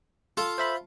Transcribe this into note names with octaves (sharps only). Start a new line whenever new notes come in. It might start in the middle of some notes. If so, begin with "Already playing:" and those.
F4 A4
C5 E5 B5